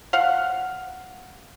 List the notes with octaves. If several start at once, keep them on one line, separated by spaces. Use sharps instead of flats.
F5 F#5